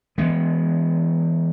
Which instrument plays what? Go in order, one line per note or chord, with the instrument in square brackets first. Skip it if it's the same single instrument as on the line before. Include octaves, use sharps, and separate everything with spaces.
[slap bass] E3 G#3 B3